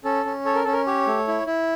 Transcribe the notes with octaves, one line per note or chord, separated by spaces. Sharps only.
C#4 A4
C#4
A4 C#5
A#4
C#4 A4
A#4
G4 C#5
A3
E4
E4